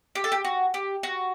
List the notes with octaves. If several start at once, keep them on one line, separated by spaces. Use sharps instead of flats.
G4
A4
G4
F#4
G4
F#4